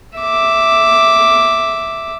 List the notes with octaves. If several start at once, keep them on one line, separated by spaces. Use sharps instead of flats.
E5 D6